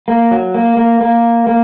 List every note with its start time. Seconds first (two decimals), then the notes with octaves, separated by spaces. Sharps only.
0.08 A#3
0.31 F#3
0.54 A#3
0.77 A#3
1.01 A#3
1.47 A#3